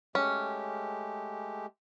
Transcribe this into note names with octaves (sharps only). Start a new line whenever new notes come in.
G#3 A3 C#4 G4